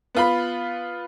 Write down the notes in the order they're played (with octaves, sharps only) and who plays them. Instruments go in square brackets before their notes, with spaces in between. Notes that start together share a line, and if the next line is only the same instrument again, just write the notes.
[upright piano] B3 F4 B5